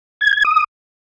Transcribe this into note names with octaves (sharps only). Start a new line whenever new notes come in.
G#6
G#6
D#6